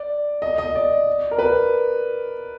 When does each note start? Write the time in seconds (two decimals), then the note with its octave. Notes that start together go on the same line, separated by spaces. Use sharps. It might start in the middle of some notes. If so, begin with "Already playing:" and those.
Already playing: D5
0.42 D#5
0.58 D#5
0.75 D5
1.31 A#4
1.39 B4